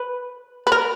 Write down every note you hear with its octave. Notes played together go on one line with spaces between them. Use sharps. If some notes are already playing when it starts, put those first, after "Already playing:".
Already playing: B4
B4
A#4